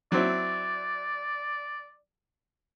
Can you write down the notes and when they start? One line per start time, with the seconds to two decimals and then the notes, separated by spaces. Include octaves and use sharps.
0.12 F#3 C4 E4 D5